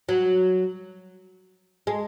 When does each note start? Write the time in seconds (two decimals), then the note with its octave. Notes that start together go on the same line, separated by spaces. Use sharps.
0.09 F#3
1.87 G#3